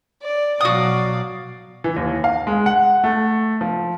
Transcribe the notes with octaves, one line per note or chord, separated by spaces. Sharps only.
D5
B2 F#3 F#4 D5 F5 D#6
E3
D#2
F5
G#3
F#5
A3
F3